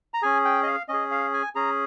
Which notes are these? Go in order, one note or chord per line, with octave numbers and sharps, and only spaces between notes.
A#5
C#4 G#4 G#5
G5
D#5
F5
C#4 G#4 D#5
F5
G#5
C#4 G#4 A#5